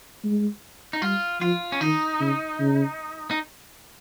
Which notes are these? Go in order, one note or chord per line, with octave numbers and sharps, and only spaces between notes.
G#3
D#4
G3 F4
F3 F4
C#4
D#3 D#4
C#3
C#3
D#4